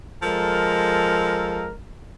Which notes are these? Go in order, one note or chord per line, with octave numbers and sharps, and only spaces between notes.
F3 G#3 A4 A#4